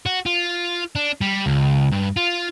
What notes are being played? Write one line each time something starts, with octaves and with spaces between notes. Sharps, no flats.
F#4
F4
D4
G3
C#2
G2
F4